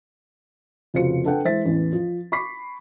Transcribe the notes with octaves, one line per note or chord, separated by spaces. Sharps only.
F1 C#3 F4 F#4 C5 C#7
D4 A4 B4 F#5 G5
E3 G#3 C5 E5 A6 B6
A1 E2
F3
B5 C#6 D6 B6 C7